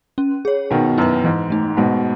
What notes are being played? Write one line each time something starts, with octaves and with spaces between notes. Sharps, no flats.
C#4
G#4 C#5
B2 D#3 B3
F#2 E4 B4
G#2 E3
A3 D#4
G#2 B2 G#3